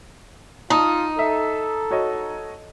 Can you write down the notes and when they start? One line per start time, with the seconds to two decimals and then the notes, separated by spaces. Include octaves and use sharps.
0.70 D#4 F4 A5 D#6
1.19 A4 E5
1.91 F#4 C#5 D#5